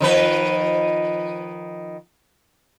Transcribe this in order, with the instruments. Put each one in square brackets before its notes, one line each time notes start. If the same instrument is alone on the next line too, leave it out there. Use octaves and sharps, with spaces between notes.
[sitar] D#3 F3 B4